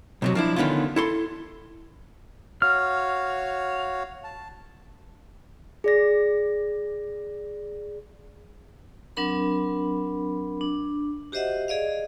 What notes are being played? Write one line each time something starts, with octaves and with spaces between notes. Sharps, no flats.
B1 C3 F#3
F3 D4 E4
D3 D#3 B3 C#4 F4
E4 A4 C6
F#4 C#5 F5 F6
A5
G#4 D5 A#6
F#3 C4 D4 A#4 B5
D4
F#4 G4 C5 D#5 E5 F#5
G#4 D5 D#5 F5